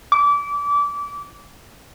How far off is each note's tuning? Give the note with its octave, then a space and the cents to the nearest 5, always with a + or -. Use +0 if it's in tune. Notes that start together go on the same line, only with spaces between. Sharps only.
D6 -25